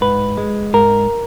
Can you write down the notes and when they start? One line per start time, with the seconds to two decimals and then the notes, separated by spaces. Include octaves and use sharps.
0.01 G#2 B4
0.37 G#3
0.74 G#2 A#4